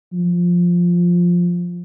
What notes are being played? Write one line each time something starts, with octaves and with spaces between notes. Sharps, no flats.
F3